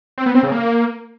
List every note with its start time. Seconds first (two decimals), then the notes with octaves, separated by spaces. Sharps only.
0.18 C4
0.26 B3
0.35 C4
0.43 C#3
0.52 A#3